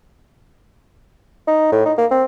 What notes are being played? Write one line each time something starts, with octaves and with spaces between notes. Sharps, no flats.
D#4
A2
D#4
A#3
C4